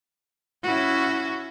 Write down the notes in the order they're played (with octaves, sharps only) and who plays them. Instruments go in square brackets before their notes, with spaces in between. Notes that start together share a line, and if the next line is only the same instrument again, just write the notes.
[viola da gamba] C#4 E4 F#4